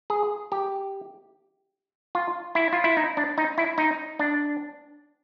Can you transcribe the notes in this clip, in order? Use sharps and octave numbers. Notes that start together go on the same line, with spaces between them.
G#4
G4
F4
E4
F4
E4
D#4
D4
D#4
E4
D#4
D4